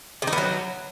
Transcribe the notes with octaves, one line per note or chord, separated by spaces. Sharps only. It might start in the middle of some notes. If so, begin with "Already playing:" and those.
C3
D#4
B3
F#3